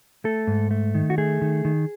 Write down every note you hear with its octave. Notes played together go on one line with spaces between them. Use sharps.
A3 A4
G#2
A3
D#3
F#4
A3 G#4
D#3
D#3